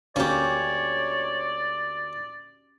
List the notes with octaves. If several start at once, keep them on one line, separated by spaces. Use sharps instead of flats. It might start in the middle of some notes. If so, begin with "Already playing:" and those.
D2 A#3 C#4 G4 C#5 D5